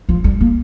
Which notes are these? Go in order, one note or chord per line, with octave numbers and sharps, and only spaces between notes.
F3
G3
A#3